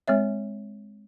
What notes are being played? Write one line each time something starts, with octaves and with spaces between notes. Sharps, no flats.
G#3 C4 C#5 E5